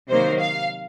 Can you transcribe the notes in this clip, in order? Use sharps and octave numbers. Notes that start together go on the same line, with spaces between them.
C3 D#3 F#3 A#3 C5
F5